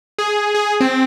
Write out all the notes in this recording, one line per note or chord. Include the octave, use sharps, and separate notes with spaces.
G#4
G#4
C4